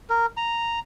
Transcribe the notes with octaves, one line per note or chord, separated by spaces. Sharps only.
A#4
A#5